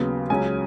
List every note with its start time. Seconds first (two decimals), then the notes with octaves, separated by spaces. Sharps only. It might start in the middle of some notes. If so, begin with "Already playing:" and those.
Already playing: D#2 C#3 F#3 B3
0.30 C#2 C#3 F#3 C#4 G#5